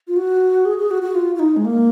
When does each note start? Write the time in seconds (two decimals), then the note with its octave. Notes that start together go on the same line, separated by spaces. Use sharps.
0.08 F4
0.16 F#4
0.65 G#4
0.78 G#4
0.91 F#4
1.02 F#4
1.15 F4
1.35 F4
1.39 D#4
1.57 G#3
1.65 A#3